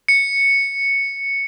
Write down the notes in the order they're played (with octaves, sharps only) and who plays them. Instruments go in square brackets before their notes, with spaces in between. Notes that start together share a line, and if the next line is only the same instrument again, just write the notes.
[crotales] C#7